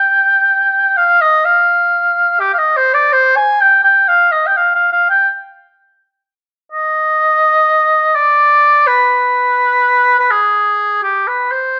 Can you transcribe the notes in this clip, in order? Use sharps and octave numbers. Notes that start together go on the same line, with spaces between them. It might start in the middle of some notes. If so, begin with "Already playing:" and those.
Already playing: G5
F5
D#5
F5
G4
F5
D#5
C5
D5
C5
G#5
G5
G5
F5
D#5
G5
F5
F5
F5
G5
D#5
D5
B4
B4
G#4
G4
B4
C5